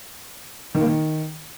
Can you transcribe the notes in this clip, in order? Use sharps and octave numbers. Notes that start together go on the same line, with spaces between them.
D#3
A#3
D#3